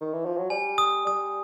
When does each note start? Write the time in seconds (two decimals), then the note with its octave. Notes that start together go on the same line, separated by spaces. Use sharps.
0.01 D#3
0.13 E3
0.26 F3
0.38 F#3
0.50 G3 G#5
0.78 D#6
1.07 G3 D#6